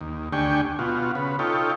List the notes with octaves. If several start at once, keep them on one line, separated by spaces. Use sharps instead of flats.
D#2
D2 D4 G4 G5 G#5 C#6
B2 F4 F#4
C#3 B4
D#4 F4 A4 C#5 G5